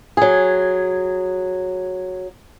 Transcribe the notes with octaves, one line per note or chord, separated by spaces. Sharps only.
F#3 G#4